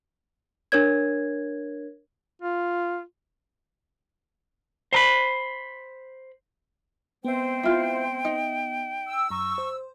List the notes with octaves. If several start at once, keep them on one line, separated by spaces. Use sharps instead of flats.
D4 A#4 C#5 G#6
F4
C5 A#5 B5
G#3 B3 C4 C5 E5 G5
E4 F4
D#4
E6
F#2 A#5 C#6 D#6
C5